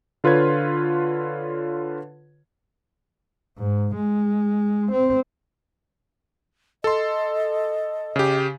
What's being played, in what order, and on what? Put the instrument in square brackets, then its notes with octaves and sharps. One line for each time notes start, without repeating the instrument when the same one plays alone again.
[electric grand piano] D3 F4 B4 C#5 G#6
[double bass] G#2
G#3
C4
[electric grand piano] A4 C6 [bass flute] D#5
[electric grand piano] C#3 G4